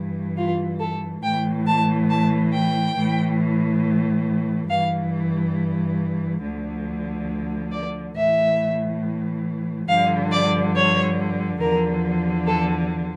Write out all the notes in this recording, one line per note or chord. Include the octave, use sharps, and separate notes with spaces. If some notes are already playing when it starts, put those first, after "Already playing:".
Already playing: G2 E3
F4
A4
A2 E3 G5
A5
A5
G5
A2 E3
G2 E3 F5
D2 D3 F3
D5
A2 E3 E5
G2 D3 F3 F5
D5
C#5
E2 D3 F3 A#4
A4